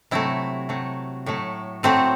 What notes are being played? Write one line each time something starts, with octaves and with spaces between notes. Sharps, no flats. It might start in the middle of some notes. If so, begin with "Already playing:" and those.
C3 F#3 A3 E4
C3 F#3 A3
A2 F#3 A3
A2 F#3 A3 C4